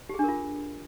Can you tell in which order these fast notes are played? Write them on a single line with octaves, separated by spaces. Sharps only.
G4 G#4 D4 A#4 F4